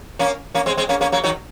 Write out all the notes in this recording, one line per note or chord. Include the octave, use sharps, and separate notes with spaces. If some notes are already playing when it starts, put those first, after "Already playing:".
A#3 C#4
A#3 C#4
G#3 C4
G#3 C4
A#3 C#4
A#3 C#4
F#3 A#3
D#3 F#3